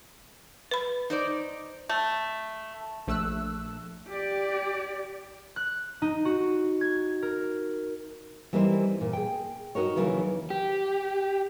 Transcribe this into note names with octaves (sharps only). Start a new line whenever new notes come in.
B4 B5
D#4 C5 D5
A3
A#1 A3 E6 F#6
G4 D5
F#6
D#4
F#4
G#6
A#4
E3 G3 A#3 C4 D#4 C5
A#2
G#4 G5
D#4 F#4 A#4 C#5
D#2 C#3 E3 F#3 A#4
G4